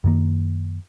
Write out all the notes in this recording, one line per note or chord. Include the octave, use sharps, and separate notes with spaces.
F#2 D#3 A#3